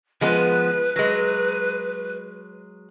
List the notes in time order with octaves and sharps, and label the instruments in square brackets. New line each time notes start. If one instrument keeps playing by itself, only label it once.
[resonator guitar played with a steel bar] F3 G#3 B3 [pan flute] B4
[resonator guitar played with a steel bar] F#3 G#3